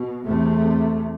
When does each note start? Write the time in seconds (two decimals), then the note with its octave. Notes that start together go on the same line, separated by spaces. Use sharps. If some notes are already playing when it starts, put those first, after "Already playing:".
Already playing: B2
0.24 E2 C3 A3